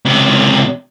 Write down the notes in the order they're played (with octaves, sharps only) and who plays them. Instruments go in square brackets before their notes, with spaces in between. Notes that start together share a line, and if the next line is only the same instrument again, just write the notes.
[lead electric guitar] C#2 C3